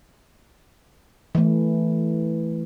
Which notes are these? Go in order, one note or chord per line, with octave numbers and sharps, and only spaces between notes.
E3 A3